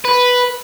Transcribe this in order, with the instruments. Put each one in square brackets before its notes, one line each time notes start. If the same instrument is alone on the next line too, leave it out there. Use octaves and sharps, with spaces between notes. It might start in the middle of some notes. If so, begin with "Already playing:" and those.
[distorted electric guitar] B4